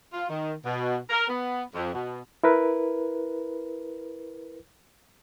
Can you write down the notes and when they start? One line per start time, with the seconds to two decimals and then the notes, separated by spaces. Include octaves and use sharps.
0.13 F4
0.29 D#3
0.65 B2
1.10 A#4
1.28 B3
1.74 F2
1.94 B2
2.44 E4 A#4 B4